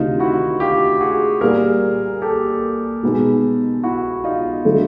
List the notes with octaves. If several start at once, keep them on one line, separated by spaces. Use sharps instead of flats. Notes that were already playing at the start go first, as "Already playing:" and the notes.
Already playing: D2 C3 D#3 D#4 F4
E4 F#4
F4 G4
F#4 G#4
A#2 G3 A#3 G#4 A#4
G4 A4
B2 G#3 B3 D#4 G#4
E4 F#4
D#4 F4
D3 F#3 A3